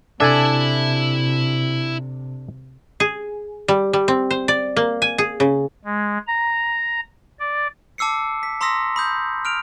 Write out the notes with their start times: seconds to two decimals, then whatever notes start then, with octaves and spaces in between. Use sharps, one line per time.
0.20 C3 D4 E4 A4 E5 G#5
3.00 G#4
3.68 G3
3.93 G3
4.08 C4
4.31 C5
4.48 D5
4.76 A#3
5.02 G#5
5.18 G#4
5.40 C#3
5.85 G#3
6.27 A#5
7.40 D5
7.98 A5 D6 E6 C7 C#7
8.43 B6
8.61 A#5 C6 D#6 E6 A#6 B6
8.96 B5 D#6 G6
9.45 F6 D7 F7